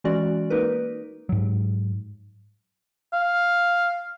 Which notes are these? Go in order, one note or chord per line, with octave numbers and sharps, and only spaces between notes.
E3 G#3 C#4 F#4 D5
A#3 D#4 A#4 B4
G#2 F#3
F5